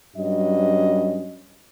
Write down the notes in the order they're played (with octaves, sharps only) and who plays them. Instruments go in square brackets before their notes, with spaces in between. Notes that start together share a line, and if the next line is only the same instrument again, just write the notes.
[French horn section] G2 F#3 C#4 D#5